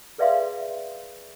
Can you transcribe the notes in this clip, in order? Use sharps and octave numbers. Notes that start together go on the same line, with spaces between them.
G#4 B4 D5 E5 F5 C6